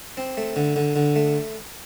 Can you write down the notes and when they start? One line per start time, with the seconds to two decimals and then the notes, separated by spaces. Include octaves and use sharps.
0.17 C4
0.37 A3
0.56 D3
0.76 D3
0.96 D3
1.16 A3